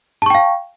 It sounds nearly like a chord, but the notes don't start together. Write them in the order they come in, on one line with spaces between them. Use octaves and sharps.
A5 C#6 G5 F5